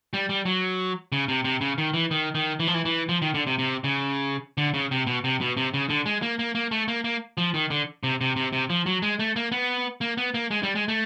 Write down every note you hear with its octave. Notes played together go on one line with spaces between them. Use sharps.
G3
G3
F#3
C#3
C3
C3
C#3
D#3
E3
D#3
D#3
E3
F3
E3
E3
F3
D#3
D3
C3
C3
C#3
D3
C#3
C3
B2
C3
B2
C3
C#3
D3
G#3
A#3
A#3
A#3
A3
A#3
A#3
F3
D#3
D3
C3
C3
C3
C3
F3
F#3
G#3
A3
A#3
B3
A#3
B3
A#3
G#3
G3
G#3
A3